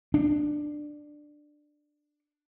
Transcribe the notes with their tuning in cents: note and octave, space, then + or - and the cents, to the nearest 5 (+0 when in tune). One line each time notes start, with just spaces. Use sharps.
D4 +15